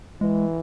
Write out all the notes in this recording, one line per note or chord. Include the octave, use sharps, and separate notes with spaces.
E3 G#3